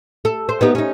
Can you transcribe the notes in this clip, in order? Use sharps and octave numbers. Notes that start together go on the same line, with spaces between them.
A4
C5
B3 D#4 G4
C#4 D#4